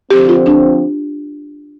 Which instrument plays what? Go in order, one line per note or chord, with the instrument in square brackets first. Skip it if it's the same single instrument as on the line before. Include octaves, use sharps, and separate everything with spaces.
[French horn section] D3 F3 C4 [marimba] G4
[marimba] F4
D4